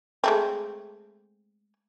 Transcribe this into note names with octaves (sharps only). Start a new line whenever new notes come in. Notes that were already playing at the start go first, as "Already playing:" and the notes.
G#3 A3 C4